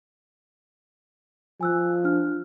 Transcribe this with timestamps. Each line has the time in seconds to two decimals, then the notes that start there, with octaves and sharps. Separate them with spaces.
1.61 F3 G#5 E6 F#6
2.04 D4 F6